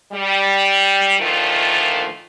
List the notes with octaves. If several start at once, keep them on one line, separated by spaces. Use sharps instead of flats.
G3
D2 A#2 D#3 F3 A3 F4